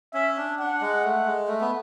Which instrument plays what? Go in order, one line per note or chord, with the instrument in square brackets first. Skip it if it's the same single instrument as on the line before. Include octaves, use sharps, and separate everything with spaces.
[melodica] C#4 [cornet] E5
[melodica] D4
[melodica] D4 [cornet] F#5
[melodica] G#3
A3
G#3
A3
B3